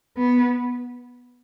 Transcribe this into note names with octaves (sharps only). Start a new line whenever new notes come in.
B3